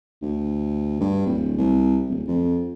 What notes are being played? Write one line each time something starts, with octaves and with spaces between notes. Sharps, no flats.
D2
G2
D1
C2
D1
F2